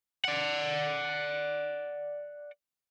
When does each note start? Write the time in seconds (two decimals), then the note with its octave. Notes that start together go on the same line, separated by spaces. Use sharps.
0.25 D5 F#5